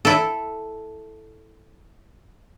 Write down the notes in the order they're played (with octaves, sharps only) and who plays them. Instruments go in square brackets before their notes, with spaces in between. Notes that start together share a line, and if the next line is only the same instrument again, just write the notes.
[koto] E4 A4